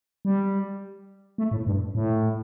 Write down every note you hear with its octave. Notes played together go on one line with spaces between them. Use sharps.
G3
A3
A2
G2
A2